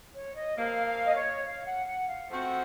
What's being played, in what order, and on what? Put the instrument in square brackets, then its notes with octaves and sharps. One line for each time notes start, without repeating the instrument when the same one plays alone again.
[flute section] C#5
D#5
[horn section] C3 F3 A#3 [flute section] F5
[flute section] F5
D#5
C#5
F5
F#5
F#5
F5
[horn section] F3 A3 C4 F#4 [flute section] F#5